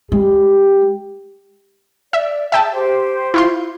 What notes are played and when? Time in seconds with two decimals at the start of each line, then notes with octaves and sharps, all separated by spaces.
0.12 G#3 G4
2.13 D5 E5
2.52 G#4 E5 G5 A5
2.73 G4 C5
3.34 E4 F4 C6